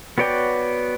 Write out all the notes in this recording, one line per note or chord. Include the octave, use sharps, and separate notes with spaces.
B3 F#4 C#5 D5 G5